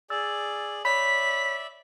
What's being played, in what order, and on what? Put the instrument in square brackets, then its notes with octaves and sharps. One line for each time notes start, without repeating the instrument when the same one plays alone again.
[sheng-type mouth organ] G#4 D5 [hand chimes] E6 A6
[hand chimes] C#5 B5 [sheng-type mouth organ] D5 E5 [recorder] B6